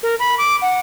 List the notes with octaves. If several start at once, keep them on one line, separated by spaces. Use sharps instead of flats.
A#4
B5
D6
F#5